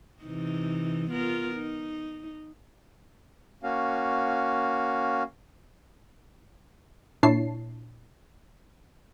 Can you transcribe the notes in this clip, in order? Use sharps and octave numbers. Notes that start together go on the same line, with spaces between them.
C3 E3 D#4
B3 F4 A#4
D#4
A#3 C#4 F#4 F5
A#2 D4 E4 C#5 A5 C7